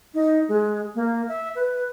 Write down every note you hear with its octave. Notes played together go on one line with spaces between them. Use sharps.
D#4
G#3
A#3
E5
B4